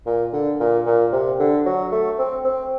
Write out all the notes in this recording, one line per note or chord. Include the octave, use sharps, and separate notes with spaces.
A#2
D3
A#2
A#2
C3
D3
F#3
A3
C4
C4